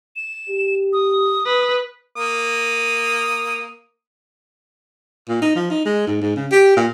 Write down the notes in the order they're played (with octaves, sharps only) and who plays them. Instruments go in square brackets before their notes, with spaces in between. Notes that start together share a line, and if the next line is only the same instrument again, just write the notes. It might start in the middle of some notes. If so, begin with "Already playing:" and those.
[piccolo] E7
[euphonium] G4
[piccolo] D#6
[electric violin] B4
[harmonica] A#3 D#6
[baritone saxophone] A#2
D#4
F3
D#4
G#3
G#2
G#2
C#3
G4
A#2